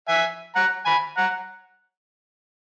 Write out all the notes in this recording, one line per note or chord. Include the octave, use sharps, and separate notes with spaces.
E5 G#5
F#5 A#5
G#5 B5
F#5 A#5